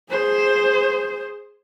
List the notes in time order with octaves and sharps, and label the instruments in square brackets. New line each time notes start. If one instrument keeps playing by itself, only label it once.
[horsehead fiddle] G#4 C5